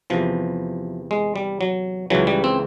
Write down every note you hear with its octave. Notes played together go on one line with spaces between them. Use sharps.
E2 C3 E3 F3
G#3
G3
F#3
C#2 C#3 E3 F#3
G3
C4